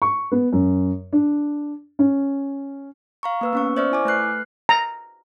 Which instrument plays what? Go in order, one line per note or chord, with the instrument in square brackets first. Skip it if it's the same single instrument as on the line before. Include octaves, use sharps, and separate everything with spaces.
[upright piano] C#6
B3
F#2
D4
C#4
[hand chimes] F5 A#5 C#6
A#3 B4 E6
B3 C#4 C#6
C5 D5 E5 C#6 F6
E4 G#5 D6
A3 B4 F6 F#6 C7
[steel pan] A#5